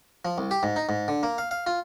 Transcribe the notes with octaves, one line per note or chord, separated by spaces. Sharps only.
F3
C2
G4
G#2
D#4
G#2
D3
A#3
F5
F5
F4